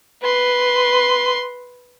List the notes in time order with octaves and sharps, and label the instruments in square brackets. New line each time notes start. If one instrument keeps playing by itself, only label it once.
[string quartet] B4 C6